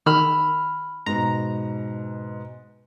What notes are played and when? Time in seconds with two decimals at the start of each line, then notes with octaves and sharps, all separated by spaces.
0.06 D#3 B5 E6 F6
1.06 G#2 B2 A#5